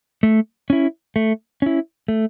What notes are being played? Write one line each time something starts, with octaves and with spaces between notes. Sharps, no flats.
A3
C#4 E4
A3
C#4 E4
A3